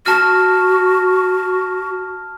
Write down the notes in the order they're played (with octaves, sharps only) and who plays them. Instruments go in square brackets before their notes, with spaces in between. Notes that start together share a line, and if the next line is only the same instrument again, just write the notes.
[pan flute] F#4 [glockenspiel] A5 F6